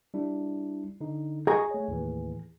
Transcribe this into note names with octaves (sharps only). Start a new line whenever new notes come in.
G3 D4 E4
D3 D#4
G#4 D#5 A#5 C#6 A#6
A3 C#5
D#2 A2 E3